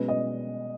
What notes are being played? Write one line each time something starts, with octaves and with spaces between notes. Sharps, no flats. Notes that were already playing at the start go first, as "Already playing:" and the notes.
Already playing: B2 G#3 C#4 B4
D#5